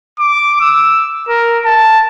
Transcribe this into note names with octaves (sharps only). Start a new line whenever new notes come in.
D6
E6
A#4
A5